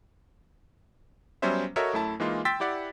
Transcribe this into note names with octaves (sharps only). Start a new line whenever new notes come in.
F#3 G3 B3 C#4 C5 E5
F#4 A4 A#4 C#5 D#5 E5
F#2 A3 E4 A5
E3 G#3 A#3 D#4 F4
G5 C6 E6 A6 B6
E4 G4 D5 F#5